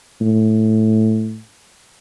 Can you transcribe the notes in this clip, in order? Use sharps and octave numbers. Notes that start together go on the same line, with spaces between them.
A2